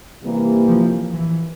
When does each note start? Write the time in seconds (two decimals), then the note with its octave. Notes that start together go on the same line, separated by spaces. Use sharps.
0.22 C3 E3 G3 A#3
0.67 F3
1.14 E3